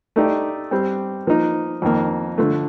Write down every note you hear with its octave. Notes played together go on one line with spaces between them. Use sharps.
A3 D#4 G4 D5
G3 C4 G4
F3 A#3 D#4
F2 D#3 A#3
D3 F3 A3